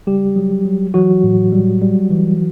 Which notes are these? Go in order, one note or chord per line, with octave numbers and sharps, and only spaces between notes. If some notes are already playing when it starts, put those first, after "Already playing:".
C#3 G3 G4
F#3
F#3
E3 F#3 F#4
A2
G3
G3
E3